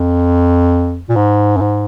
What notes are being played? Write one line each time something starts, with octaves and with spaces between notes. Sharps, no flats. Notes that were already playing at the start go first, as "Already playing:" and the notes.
Already playing: F2
A#2
G#2
F#2
G#2